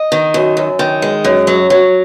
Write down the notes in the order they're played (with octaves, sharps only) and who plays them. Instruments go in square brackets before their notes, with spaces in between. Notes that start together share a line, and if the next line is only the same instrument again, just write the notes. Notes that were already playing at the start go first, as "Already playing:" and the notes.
Already playing: [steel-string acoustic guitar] D#5
D#3
F#2
F#2
D#3
G#3
F#2
F#3
F#3